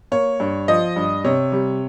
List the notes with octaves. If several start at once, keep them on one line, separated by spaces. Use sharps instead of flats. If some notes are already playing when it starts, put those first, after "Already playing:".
A#3 C#5
G2
F3 D#5
G2
C3 C#5
G3